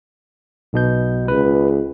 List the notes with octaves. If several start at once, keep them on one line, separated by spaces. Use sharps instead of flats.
B1 B2 G6
C#2 B4